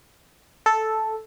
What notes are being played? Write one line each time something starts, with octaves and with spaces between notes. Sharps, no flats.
A4